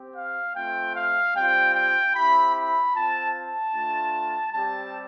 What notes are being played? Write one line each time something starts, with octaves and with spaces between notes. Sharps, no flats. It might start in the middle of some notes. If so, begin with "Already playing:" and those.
Already playing: C4 G4
F5
A3 C4 F4 G5
F5
G3 C4 F4 G5
G5
C4 E4 G4 B5
B5
C4 F4 A5
A5
A3 D4 F4
G3 C4 G4 A5